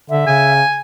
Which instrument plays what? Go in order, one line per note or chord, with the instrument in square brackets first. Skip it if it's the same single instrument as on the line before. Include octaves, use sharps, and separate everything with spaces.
[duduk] D3 [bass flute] E5
[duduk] C#3 [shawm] G#5